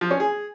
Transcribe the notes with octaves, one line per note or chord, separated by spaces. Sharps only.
F3
C#4
G#4